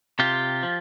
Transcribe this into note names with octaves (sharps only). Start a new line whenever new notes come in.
C3 F4 G4
F3